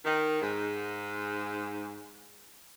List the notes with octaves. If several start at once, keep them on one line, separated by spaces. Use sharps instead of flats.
D#3
G#2